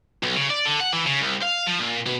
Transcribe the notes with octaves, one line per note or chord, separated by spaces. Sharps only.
B1
C#3
D5
D3
F#5
E3
C#3
C2
F5
F3
A#2
B2